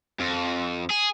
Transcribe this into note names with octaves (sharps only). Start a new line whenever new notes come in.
F2
G#4